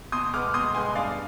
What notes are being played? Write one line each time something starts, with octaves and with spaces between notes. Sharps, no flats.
B2 C6 D#6
G#3 B3 D6 F6
B2 C6 D#6
G#3 B3 G#5 C6
G2 D5 F5